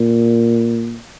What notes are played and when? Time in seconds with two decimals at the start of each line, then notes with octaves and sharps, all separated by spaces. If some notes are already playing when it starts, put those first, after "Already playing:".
Already playing: A#2